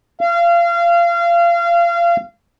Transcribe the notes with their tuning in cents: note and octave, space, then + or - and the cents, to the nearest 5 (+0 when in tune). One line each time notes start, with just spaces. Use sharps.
F5 -30